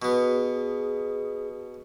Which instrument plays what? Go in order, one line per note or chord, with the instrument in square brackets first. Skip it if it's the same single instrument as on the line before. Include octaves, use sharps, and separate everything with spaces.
[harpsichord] B2 B3 [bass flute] G#4